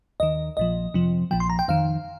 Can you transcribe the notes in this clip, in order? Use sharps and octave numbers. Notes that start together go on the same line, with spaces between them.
D#2 D#3 D#5
A#1 A#2 F3 D#5
F2 C3 F3
A#1 A#2 F3 G5
C6
A#5
G5
F2 D#3 F5